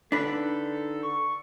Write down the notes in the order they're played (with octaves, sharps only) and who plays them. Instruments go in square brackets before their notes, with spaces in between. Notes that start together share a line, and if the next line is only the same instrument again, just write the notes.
[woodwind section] D3 D#4 A4 [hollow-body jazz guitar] D4 B4
[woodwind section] C#6